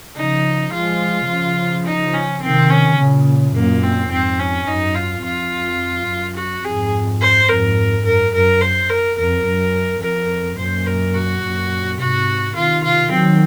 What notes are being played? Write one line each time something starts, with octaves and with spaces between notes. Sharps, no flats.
C#3 F3 D#4
F3 G#3 F4
C#3 F3
D#4
C#4
C3 D#3 C4
C#4
A#2 C#3
F#2 A#2 A#3
C4
F2 G#2 C4
C#4
F#2 D#4
F4
F2 F4
F#2
F#4
F2 G#2 G#4
C5
F2 G#2 A#4
F#2 A#4
F#2 A#4
C5
A#4
F2 A#4
F#2
F2 A#4
F#2 A#2 C5
A#4
F#4
F#2 A#2
G#2 C3 F#4
C3 D#3 F4
F4
D#3 F#3 C4